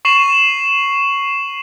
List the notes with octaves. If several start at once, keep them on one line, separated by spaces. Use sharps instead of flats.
C#6 C7 E7 F#7